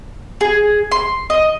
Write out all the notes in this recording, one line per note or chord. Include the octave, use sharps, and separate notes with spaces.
G#4
C6
D#5